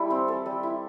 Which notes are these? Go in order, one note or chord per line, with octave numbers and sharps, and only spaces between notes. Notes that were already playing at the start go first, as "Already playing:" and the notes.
Already playing: G3 E4 A4
C4
A4
G3
E4